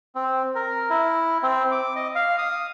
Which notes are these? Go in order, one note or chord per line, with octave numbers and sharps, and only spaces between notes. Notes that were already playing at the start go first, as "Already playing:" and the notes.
C4
A#4
E4
C4
D6
D#5
F5
D#6